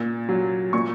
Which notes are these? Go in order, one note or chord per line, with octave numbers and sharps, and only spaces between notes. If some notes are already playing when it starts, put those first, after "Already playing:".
Already playing: A#2
F#3
A#2 C#6